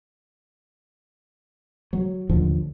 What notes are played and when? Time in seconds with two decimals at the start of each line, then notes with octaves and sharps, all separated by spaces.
1.93 F#3
2.29 A1 D#2 D3 F3